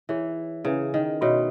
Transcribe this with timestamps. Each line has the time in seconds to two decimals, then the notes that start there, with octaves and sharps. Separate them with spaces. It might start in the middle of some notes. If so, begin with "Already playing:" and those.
0.09 E3 E4 G#4 C#5
0.65 C#3 C#4 E4 B4 E5 G#5
0.94 D#3
1.21 B2 F#4 C#5 E5 B5